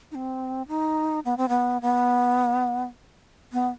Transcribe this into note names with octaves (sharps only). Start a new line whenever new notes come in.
D#4
C4
D#4
B3
C4
B3
B3
B3